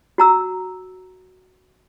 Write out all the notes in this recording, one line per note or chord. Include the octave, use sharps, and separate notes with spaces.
F#4 A#5 E6